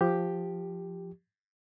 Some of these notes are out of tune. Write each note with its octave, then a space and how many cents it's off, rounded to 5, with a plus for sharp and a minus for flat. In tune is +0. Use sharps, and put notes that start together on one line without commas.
F3 +0 G4 +0